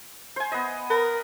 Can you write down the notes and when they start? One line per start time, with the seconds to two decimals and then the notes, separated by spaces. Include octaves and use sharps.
0.36 C5 G#5
0.52 B3 D#5
0.90 A#4 B4